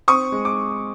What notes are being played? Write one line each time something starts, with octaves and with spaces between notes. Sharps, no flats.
C4 C#6 D#6
G#3
D6